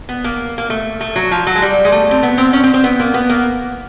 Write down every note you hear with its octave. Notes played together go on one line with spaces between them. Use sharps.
B3
A#3
A#3
A3
A3
F#3
F3
F#3
G#3
G3
G#3
A3
C4
B3
C4
C#4
C4
C4
B3
A#3
B3
A#3